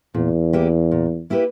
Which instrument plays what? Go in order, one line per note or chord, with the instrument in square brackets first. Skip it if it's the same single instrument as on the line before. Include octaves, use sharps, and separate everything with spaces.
[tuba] E2 [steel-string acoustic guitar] A#2
[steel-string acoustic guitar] A#3 E4 G4 B4
A#2
A#3 E4 G4 B4